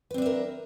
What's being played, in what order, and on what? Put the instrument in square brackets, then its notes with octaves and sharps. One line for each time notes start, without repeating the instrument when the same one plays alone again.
[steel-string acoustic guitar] B4
C4
D4
E5
A#4